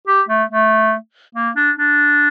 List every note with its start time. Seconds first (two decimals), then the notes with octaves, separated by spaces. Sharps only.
0.07 G4
0.29 A3
0.50 A3
1.35 A#3
1.57 D4
1.78 D4